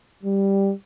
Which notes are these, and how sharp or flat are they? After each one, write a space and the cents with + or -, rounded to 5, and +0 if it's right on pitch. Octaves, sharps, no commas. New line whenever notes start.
G3 +5